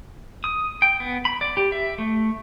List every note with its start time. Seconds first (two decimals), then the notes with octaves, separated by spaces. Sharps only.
0.44 D#6
0.82 G5
1.00 B3
1.25 B5
1.41 D5
1.57 G4
1.72 E5
1.98 A3